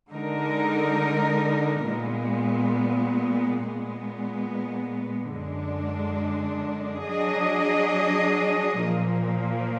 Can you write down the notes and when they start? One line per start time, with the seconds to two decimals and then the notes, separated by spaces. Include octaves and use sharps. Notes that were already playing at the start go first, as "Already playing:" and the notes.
0.10 D3 G#3 D#4 A#4
1.85 A#2 G#3 B3
3.59 A#2 G#3 B3
5.33 F#2 D3 G#3 D4
7.07 F#3 D4 G#4 D#5
8.81 A#2 F3 A#3